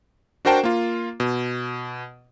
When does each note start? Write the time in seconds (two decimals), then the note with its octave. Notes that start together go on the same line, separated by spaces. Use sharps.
0.45 D4 F#4 A#4 C5 G5 A5
0.63 A#3 F4
1.20 B2